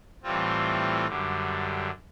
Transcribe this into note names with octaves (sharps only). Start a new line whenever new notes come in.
A2 E3 G3 C4 F4
F#2 D3 G3